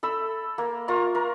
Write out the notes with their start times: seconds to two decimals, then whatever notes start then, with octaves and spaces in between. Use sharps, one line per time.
0.03 A4 B5 E6
0.58 A#3
0.88 F4 A#4 A#5 C#6
1.15 A#4